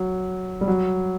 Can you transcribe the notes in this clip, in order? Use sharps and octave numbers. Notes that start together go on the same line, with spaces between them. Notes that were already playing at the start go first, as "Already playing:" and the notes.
Already playing: F#3
G3
F#3